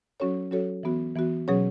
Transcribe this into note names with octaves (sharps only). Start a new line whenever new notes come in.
F#3 C#4 F#4 A4 C#5
F#3 C#4 F#4 A4 C#5
E3 B3 F#4
E3 B3 F#4
B2 F#3 C#4 G#4 C#5